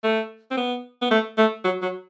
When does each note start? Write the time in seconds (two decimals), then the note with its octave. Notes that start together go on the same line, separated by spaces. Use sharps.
0.04 A3
0.51 C4
0.57 B3
1.02 B3
1.11 A3
1.38 A3
1.65 F#3
1.82 F#3